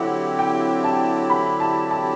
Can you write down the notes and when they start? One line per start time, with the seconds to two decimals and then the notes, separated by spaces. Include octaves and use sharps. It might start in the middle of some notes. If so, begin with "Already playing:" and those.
Already playing: D3 F#3 C4 E4 G4 F#5
0.39 G5
0.84 A5
1.30 B5
1.60 A5
1.91 A5